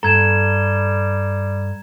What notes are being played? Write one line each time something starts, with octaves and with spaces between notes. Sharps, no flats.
G2 G3 A4 A#5 G#6 E7